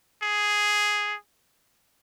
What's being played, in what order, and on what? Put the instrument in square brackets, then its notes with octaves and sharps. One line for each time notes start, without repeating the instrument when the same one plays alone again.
[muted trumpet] G#4